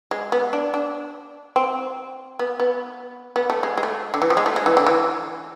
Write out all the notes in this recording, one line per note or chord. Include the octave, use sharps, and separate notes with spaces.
G#3
B3
D4
D4
C4
B3
B3
B3
A3
G#3
G#3
A3
D3
E3
F3
G#3
A3
G#3
E3
D3
E3